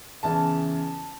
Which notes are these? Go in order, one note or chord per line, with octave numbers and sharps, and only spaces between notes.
E2 C#3 E3 A5